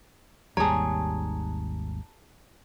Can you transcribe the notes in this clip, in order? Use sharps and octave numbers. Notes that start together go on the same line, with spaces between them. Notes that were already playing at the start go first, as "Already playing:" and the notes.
G#1 D#2 G3 G#4 C#5 A5 A#5